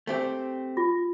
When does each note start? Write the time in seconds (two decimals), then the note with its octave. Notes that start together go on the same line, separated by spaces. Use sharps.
0.07 A3 C4 G4
0.77 F4